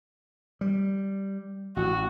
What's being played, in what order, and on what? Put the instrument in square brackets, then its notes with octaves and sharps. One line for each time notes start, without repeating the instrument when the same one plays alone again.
[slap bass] G3
[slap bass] A1 [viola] F#4